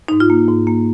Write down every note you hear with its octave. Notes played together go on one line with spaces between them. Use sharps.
G#2 D#4
F4
A#3
G#2
A#3